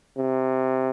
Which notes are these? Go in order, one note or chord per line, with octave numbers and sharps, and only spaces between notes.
C3